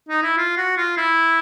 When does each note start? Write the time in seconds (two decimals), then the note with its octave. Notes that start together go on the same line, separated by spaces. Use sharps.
0.09 D#4
0.23 E4
0.38 F4
0.58 F#4
0.78 F4
0.97 E4